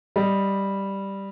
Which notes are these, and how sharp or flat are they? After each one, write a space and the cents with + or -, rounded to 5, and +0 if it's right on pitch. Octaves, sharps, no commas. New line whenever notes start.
G3 +0 D#5 +0